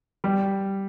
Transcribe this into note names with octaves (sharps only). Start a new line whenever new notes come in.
G3